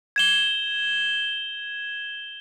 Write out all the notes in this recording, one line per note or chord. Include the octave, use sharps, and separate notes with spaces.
G#6 E7 G7